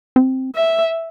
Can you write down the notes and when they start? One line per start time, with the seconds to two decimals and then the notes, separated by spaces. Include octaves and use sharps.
0.16 C4
0.55 E5